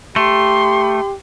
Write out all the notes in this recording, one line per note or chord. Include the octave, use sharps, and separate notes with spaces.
A3 G4 C6